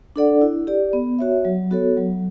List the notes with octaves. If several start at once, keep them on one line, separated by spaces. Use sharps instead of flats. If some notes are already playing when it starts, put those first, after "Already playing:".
D4 A4 D5 F#5
E4
G4 D5
B3
F#4 C#5 E5
F#3
B3 F#4 A4 C#5
F#3